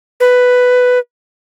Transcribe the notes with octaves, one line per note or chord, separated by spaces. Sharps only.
B4